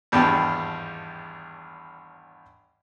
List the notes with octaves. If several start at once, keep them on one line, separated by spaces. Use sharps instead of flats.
G#1 E2 G2 G4 G5 A5